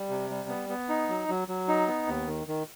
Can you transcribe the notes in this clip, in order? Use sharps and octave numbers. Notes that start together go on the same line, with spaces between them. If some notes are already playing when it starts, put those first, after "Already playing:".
Already playing: G3
C3
G3
B3
B3
D#4
F#3
F#3
F#3
D#4
B3
D#2
D#3
D#3